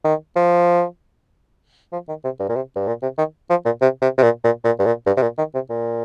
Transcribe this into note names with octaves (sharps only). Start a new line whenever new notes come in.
D#3
F3
F3
D#3
C3
G2
A#2
C3
G2
A#2
C3
D#3
F3
A#2
C3
C3
C3
A#2
A#2
A#2
G2
A#2
G2
C3
A#2
D#3
C3
A#2